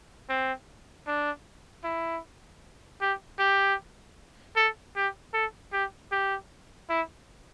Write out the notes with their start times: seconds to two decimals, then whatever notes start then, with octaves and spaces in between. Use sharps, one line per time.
0.29 C4
1.07 D4
1.84 E4
3.01 G4
3.39 G4
4.56 A4
4.96 G4
5.34 A4
5.72 G4
6.12 G4
6.89 E4